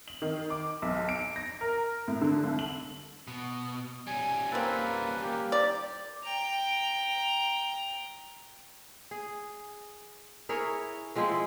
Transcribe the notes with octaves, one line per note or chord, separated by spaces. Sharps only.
F#7
D#3
D6
B1
D7
A#6
A#4
A2
D3
C2
F#7
B2
G3 C#4 G#5
A#3 C4 A4 B4
A#3 G4
D5
G5 A#5
G#4
E4 G#4 A#4 C#5
F3 G#3 C4 E4